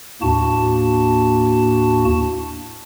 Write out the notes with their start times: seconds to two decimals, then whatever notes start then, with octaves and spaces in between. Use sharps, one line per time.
0.22 D#2 A2 A#3 D4 F#4 A5